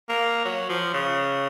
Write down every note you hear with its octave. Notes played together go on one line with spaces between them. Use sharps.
A#3
F#3
F3
C#3